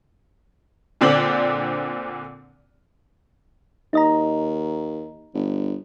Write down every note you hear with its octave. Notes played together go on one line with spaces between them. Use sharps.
A#2 D3 C4 D5 F#7
D#2 D#4 D#5 A#5
G1